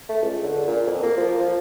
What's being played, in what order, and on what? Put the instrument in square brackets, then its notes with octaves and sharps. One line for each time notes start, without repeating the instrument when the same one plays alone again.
[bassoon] A3
C#2
D3
A#2
F2
A#3
F3
F3